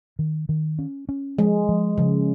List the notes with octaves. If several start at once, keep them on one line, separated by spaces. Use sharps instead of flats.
D#3
D#3
C#4
C#4
F3 G#3
F3
C#3 F3